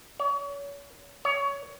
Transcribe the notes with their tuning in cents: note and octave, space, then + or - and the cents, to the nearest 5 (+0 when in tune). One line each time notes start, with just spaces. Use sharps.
C#5 +35
C#5 +20